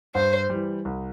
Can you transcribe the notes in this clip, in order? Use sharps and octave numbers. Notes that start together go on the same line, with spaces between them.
G2 C5
E3 G3
C2